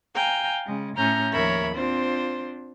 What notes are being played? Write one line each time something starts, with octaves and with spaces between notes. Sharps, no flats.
F5 G5 G#5 A#5
C#3 G#3
A2 C#4 A#5 F6 G6
D#2 F3 A#4 C#5 E5 B5
C4 D4 F4 C5